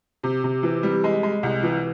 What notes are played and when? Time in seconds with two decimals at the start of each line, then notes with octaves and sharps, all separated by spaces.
0.23 C3
0.44 C3
0.63 E3
0.83 G3
1.04 G#3
1.23 G#3
1.43 C2
1.63 E3